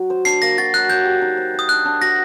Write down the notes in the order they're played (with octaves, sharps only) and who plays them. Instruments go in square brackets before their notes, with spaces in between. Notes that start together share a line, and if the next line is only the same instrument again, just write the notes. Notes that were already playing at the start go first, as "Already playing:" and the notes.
Already playing: [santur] F#3
C5
[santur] D4 [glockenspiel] C7
[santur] A#3 [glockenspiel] A#6
[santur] F#4 [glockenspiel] A6
[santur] F#3 [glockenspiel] F#6
[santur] F#3 [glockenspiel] G6
[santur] G4
D#4
C5
C5
[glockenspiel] D#6
[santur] D4 [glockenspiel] F#6
[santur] D4
[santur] F#4 [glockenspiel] A#6